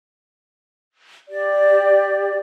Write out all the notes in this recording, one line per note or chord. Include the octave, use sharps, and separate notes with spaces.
G4 D5